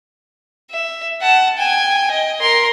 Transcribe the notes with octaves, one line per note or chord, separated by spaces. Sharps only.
E5
F#5 A5
G5 G#5
D#5
A#4 C6